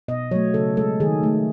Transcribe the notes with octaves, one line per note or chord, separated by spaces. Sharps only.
B2 D#5
F#3 A3 C#5
C#3 A4
G#3 A4
D#3 G#4
A3